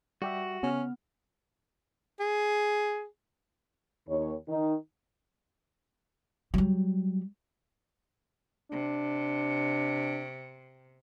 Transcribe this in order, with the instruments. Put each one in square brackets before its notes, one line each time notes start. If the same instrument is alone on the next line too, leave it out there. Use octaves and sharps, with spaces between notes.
[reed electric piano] G3 G4 E5 [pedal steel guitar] F#4
[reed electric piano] C#3 F6 [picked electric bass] B3 [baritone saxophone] C#4
[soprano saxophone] G#4
[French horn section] D#2 D#3 C#5
D#3 D#4
[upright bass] F#3 G3
[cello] C3 [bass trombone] D4